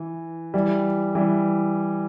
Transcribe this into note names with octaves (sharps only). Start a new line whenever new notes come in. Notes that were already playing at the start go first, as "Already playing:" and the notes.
Already playing: E3
E3 G3
E3 G3